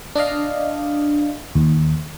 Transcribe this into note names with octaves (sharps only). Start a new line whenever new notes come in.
D4 D5 D#5 F5
D#2